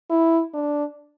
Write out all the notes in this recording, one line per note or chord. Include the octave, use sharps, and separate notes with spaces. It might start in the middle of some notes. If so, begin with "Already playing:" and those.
E4
D4